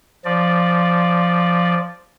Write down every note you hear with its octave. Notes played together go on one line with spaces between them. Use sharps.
F3 D5